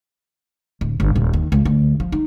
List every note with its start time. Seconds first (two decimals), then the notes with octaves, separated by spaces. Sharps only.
0.81 D1
1.00 G1
1.16 D#1
1.34 D#2
1.52 C#2
1.65 D2
2.00 F3
2.12 D#4